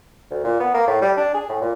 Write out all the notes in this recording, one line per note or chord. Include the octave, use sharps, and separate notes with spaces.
D2
A#2
B3
A#3
A2
G3
D4
G#4
A2
A#2